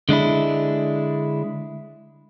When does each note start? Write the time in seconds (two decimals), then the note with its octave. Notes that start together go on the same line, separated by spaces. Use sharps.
0.09 D3 G#3 D4 E4